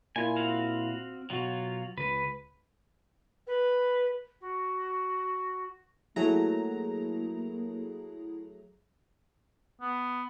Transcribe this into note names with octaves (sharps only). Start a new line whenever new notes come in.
A#2 E4 F4 G#5
C4 F#4 F5
B2 F#3 F4 F#4
C#2 B4
B4
F#4
F#3 A3 A#3 E4 G#4 A#5
B3